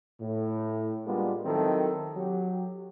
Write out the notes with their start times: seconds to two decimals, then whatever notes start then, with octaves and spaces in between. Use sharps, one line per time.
0.21 A2
1.06 G3 G#3 A#3 B3 D4 F4
1.45 D#3 F#3 C4 E4 A4
2.16 F#3 G4